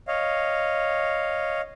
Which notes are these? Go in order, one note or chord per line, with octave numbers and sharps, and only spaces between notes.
C#5 D#5 F5